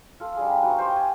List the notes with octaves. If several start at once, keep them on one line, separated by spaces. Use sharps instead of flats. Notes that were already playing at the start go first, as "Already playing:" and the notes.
F4 A4
G3 D4 G#4
A#5 B5
B3 D#4 F#4
G4 C5
G#5 C#6